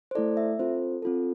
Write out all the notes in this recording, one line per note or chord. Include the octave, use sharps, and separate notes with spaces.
C5
A3 E4 A4 D5
E5
C4 F4 A4 C5
C4 F4 A4